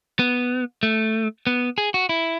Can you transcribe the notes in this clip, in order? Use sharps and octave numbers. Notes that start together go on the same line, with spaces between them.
B3
A3
B3
G#4
F#4
E4